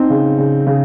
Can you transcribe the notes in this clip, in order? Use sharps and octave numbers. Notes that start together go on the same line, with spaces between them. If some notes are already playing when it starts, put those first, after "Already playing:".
Already playing: C4 D#4
C#3
C#3
C#3